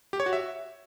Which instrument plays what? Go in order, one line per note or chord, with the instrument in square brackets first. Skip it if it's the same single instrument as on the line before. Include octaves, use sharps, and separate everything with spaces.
[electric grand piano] G4
C#5
F#4
E5